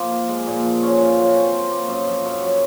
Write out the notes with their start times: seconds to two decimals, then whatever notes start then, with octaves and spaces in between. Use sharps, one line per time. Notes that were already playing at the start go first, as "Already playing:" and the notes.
Already playing: F3 A#3 C4 F4
0.11 A#4
0.28 G#3
0.47 A#2
0.64 F3
0.83 C#4
1.00 F4
1.18 F#3
1.36 C4
1.53 A#4
1.71 A#3
1.88 F#2
2.07 F3
2.25 F#2
2.42 F#3